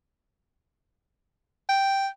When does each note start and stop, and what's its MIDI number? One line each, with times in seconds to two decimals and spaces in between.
1.69 2.07 79